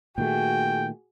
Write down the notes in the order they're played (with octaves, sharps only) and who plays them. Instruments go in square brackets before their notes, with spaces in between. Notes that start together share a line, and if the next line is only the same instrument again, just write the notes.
[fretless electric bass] A#2 D#3 A3 [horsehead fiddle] F#4 G#4 [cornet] G5